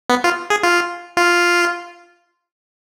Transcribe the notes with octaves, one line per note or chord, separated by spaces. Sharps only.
B3
F4
G#4
F4
F4